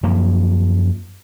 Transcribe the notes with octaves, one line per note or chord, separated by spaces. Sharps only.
F#2 F3 A#3